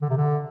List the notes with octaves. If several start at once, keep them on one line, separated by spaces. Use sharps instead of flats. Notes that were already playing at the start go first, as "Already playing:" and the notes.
D3
C3
D3